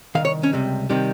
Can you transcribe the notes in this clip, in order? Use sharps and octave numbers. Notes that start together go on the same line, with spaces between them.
C2 C3 D#3 F5
C#5
C#4
C#2 C3 G3
C3 D#3 G3